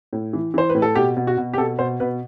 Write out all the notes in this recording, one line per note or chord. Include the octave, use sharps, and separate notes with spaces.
A2
E3
E3 C5
B4
A2
A4
B2 G4
B2
F#4
B2
G4
B2 A4
B2 C5
B2 B4